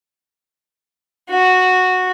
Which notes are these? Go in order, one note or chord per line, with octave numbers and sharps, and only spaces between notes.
F#4